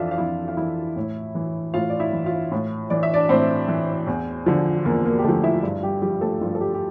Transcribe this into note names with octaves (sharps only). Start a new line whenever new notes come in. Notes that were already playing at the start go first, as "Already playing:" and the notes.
Already playing: F2 E3 D4 F4 A4 E5 F5
F5
F2 E4 E5
F5
E3 E4 E5
A2
E3
A2 F4 F5
D5
E4 E5
E3
F4 F5
A2
E3 D5
E5
D4 D5
A2 C4 C5
E3
E2
D3 F3
E2 A#3 A#4
A#3 A#4
G4
D3 F3 A3 A4
E4 E5
G2
G3 G4
F3 G3 G4
A3 A4
G2 F3 F4
A4
G3 G4
G4